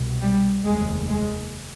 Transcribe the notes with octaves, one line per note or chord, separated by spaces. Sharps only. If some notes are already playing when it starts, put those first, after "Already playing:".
Already playing: C2 B2
G3
F1 D#2 G#3
G#3